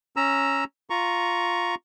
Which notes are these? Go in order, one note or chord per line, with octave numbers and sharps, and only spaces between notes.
C#4 A#5 E6
F4 A#5 C#6